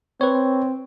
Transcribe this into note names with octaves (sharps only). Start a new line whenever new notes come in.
C4 B4 C#5